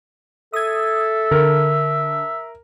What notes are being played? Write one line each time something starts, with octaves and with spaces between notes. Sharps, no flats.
A4 E5 D#6 G#6
D3 A#4